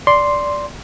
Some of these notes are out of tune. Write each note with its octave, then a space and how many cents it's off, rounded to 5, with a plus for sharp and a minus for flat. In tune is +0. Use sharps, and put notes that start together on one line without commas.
D5 -5 C6 +0